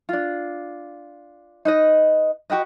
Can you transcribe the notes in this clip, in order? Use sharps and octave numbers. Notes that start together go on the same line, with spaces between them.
D4 F4
D#4 B4 D#5
F#4 G4 B4 D#5